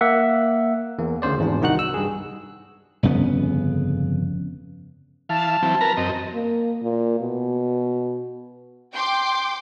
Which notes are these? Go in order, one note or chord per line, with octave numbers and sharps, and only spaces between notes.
A#3 E5 F#5
E2 A#3
D2 C#3 C5 D5
G#1 E2 D4
C2 D#3 D#4 F#4 F#5 F#6
E6
G2 G#4
G1 F2 C#3 B3
E3 F5 A5
E3 F#3 C4
A#4 B4 A#5
F#2 C4 D#5
A#3
A#2
B2
G5 C6 D6